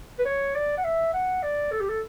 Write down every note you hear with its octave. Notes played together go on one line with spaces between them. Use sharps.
B4
C#5
D5
F#5
E5
F#5
D5
A4
G4
A4